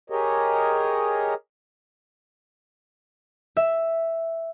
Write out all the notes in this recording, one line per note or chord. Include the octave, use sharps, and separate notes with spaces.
G4 G#4 A#4 C#5 D#5
E5